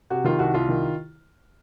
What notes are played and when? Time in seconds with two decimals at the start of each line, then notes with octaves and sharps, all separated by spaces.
0.10 C3 F#4
0.25 D#3 F4
0.39 C2 F#4
0.54 C2 F4
0.69 D#3